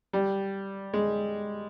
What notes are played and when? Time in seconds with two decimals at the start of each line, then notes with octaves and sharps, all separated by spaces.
0.13 G3
0.94 G#3